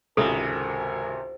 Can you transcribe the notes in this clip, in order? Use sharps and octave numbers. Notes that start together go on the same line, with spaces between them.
G#1 C#2 C3 F#4 A4 A#4 G#5